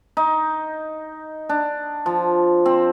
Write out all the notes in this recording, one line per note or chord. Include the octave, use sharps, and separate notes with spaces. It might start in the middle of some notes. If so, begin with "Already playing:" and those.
D#4
D4
F3
C4